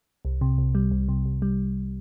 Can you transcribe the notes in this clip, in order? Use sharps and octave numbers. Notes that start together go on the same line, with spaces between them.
C2
C3
C2
G3
C2
C3
C2
G3